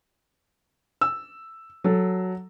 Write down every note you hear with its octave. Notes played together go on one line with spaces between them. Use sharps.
E6
F#3 A4